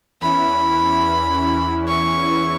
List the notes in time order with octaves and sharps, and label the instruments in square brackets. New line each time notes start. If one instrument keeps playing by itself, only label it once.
[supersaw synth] E2 E3 C#4 E4 [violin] B5
[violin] C#6